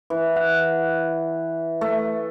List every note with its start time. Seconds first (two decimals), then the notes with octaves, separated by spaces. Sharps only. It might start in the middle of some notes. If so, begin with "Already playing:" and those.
0.10 E3
0.36 F#5
1.81 A3